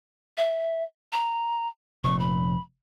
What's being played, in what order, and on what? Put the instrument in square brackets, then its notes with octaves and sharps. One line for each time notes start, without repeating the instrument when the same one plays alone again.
[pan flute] E5
A#5
[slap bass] F1 A#2 [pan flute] C#6
[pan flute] B5